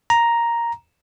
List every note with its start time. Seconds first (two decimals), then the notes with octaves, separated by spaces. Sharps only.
0.10 A#5